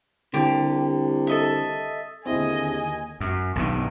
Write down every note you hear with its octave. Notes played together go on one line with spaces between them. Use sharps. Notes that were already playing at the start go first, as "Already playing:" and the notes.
C2 D3 G4
A4 D#5 E5
D#2 D3 C4 E4 G#4 D#5 G#5
F#2
B1 G2 D#3